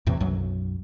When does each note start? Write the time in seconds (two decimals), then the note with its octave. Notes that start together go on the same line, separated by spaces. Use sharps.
0.06 E2 A2 C3 E3
0.20 B1 F#2 F#3